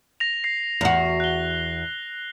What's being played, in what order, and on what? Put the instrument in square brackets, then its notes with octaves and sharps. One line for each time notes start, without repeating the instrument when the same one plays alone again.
[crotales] A#6 F7
A#6 C7
[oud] E2 F#4
[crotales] F#6 G7